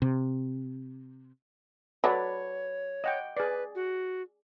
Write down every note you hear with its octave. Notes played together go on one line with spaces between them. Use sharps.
C3
F#3 A4 B4 C#5 D5
D#5 F#5 G5
G#4 B4 D5
F#4